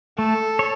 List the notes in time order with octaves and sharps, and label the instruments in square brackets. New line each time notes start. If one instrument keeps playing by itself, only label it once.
[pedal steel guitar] A3 [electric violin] A4
[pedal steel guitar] C#5